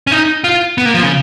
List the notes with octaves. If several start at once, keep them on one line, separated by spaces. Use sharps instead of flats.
C#4
D#4
F4
B3
A#3
F3
C#3